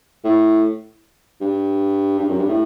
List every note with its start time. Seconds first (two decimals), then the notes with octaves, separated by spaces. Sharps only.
0.24 A2
1.41 G2
2.20 G2
2.28 F#2
2.39 G2
2.49 A2